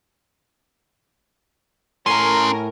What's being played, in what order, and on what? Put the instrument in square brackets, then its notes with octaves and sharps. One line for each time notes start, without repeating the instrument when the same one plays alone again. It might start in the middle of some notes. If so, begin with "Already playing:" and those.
[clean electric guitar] A2 C#5 G#5 [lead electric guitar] C#4 C6 [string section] A#4